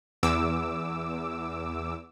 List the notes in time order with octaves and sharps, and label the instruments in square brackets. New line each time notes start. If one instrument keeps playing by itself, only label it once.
[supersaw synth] E2 D6 E6